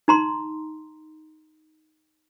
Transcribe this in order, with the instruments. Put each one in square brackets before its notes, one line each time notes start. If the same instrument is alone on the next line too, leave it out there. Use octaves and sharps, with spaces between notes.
[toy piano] D#4 A#5 C6